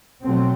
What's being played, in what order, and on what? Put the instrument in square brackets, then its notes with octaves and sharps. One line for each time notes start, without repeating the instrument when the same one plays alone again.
[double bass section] B2 F#3 A3 C4